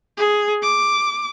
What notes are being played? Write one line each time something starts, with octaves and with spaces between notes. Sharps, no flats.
G#4
D6